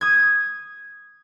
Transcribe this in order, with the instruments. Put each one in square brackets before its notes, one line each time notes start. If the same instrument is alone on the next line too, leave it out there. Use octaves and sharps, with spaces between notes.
[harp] D#6 G#6